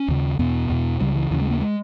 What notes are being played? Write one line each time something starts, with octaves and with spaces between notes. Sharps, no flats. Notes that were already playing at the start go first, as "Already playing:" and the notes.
Already playing: C#4
D#2 C#3
E2 B2 B3
E2 B2
C#2 C#3 G3
E3
D#2 C#3 E3
G#3
A#3
G#3